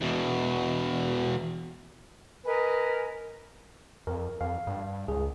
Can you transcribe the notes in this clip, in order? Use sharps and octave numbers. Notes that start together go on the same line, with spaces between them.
E2 B2
A#4 B4 D#5 G#5
F2 A#4
F2 F5
G2
C#2 G#4